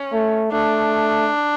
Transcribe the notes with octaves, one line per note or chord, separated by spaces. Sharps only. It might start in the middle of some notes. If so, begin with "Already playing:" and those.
Already playing: C#4
A3
A3 D4